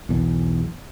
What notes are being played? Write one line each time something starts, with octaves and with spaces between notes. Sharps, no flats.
B1 E2